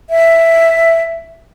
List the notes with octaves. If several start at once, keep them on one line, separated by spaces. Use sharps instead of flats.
E5